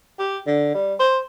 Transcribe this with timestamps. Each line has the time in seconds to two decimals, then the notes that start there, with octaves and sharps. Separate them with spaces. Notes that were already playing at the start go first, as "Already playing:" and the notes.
0.19 G4
0.47 D3
0.75 G3
1.00 C5